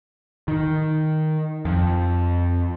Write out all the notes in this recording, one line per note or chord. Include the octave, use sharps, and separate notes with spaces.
D#3
F2